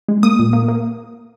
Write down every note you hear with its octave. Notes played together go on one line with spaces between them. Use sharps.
G#3
A#3 D#6
A#2
A#3
A#3